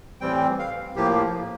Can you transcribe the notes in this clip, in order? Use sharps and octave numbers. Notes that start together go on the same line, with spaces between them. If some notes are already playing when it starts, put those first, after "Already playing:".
A2 E3 G3 C4 G5
F5
A2 F3 A#3 G4